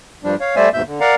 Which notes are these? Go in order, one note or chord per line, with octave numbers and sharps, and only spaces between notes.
G2 F3 G3 D4
C#5 F5
G3 A3 C5 D5 E5 G#5
D#2 G#2 B2 E5 G6
D3
A#4 D5 F5 F#5 A#5